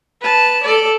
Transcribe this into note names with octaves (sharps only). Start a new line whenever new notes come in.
B4 A5
A4 D5